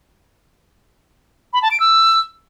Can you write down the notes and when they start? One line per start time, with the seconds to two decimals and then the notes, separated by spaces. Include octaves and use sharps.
1.53 B5
1.62 A5
1.71 D7
1.80 E6